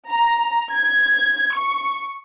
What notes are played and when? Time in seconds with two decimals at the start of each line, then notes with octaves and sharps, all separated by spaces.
0.10 A#5
0.74 G#6
1.56 C#6